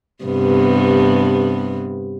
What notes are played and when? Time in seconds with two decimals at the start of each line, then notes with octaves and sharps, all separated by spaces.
0.24 G2 C3 B3